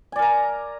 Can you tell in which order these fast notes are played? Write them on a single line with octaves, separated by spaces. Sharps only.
G#5 D5 A#4 A#5